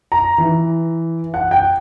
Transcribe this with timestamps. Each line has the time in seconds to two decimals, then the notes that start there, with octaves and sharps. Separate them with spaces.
0.12 A#5
0.38 E3
1.34 F#5
1.51 G5